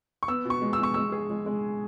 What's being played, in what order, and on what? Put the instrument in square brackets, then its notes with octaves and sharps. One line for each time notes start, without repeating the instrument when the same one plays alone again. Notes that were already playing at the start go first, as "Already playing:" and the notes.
[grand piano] C#6
[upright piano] B3 [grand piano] E6
[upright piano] B2
[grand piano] C#6
[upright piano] G#3
[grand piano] E6
[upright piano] B2 [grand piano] C#6
[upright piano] G#3 [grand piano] E6
[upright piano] G#4
G#3
G#3